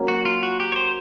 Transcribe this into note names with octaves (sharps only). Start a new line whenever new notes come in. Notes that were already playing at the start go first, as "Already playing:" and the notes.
Already playing: F#3 A#3 C#4
F#4
F4
F#4
G4
C#5
C5